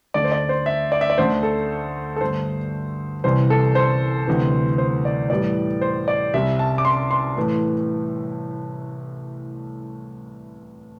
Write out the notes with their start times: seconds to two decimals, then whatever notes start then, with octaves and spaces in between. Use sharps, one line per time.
0.14 D2 D3 A3 D5
0.24 C5
0.32 D5
0.49 C5
0.66 E5
0.92 D5
1.01 E5
1.10 D5
1.18 D2 D3 A3 C5
1.43 A4
2.16 A4
2.21 G2 D3 A3 C5
3.24 C2 C3 E3 C5
3.50 A4
3.75 C5
4.27 D2 C3 E3
4.78 C5
5.05 D5
5.30 A2 E3 G3 D5
5.81 C5
6.08 D5
6.34 C2 C3 G3 E5
6.59 A5
6.78 D6
6.85 C6
7.11 C6
7.37 A2 E3 A3